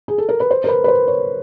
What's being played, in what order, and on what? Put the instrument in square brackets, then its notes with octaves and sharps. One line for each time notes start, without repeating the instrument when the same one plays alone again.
[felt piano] G#4
A4
A#4
B4
C5
A#4
B4
B4
C5
C#5